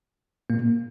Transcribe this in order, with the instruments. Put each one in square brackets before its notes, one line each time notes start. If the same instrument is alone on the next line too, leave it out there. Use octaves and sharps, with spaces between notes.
[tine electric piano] A#2 A#3